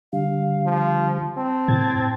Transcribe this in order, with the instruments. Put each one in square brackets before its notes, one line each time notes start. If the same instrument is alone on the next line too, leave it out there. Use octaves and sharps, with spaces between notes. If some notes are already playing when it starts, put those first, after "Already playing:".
[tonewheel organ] D3 G3 [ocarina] F5
[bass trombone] F3
[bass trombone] C4 [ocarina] A5
[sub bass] A2 [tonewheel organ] G#6 A6